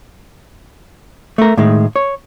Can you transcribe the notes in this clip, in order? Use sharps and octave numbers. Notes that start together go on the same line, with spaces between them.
A3 A#4
A2 D#3 G#3
C#5